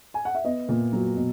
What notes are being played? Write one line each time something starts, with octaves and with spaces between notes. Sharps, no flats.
G#5
F#5
E5
B3 D#5
A#2
F#3
B2